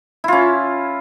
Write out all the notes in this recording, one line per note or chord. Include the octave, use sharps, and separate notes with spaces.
C#4 E4 F4